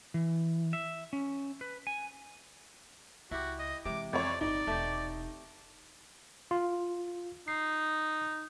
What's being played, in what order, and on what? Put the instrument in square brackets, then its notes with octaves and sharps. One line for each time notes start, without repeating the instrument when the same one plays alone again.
[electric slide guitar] E3
E5
C#4
B4
G#5
[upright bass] C#2 [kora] E4 G4 [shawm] F#4
[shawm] D#5
[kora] C3 [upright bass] E3 G#3 [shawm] D6
[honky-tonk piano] F2 C#5 [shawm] D5
[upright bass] G1 A#3 [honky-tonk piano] D#4 [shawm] D5
[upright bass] E1 [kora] A3 G4
[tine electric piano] F4
[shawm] D#4 [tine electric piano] C7